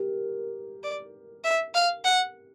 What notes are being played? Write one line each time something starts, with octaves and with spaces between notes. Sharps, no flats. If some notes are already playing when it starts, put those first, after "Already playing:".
Already playing: G4 A#4
D5
E5
F5
F#5